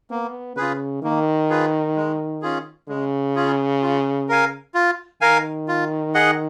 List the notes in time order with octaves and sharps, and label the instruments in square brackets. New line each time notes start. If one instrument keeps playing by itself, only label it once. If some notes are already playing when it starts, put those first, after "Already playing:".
[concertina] A#3 [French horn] B3
[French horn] C#3 [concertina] F4 G#4 B4
[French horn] D#3 [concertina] A#3
[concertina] F4 G#4 B4
G#3
C#4 F4 G#4
[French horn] C#3 [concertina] G#3
[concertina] C#4 F4 G#4
F4
A#4 F5 G#5
F4
[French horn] D#3 [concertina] A#4 F5 G#5
[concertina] F4
G#4 D#5 F#5